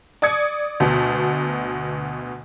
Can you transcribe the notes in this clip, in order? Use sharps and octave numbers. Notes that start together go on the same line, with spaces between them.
D5 D#6 G#6 C#7
D2 B2